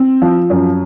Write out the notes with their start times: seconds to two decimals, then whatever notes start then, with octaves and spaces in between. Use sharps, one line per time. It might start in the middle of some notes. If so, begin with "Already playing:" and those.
Already playing: C4
0.22 F3
0.50 F#2